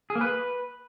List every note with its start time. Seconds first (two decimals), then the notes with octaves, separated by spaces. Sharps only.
0.10 G#4
0.15 A#3
0.21 B4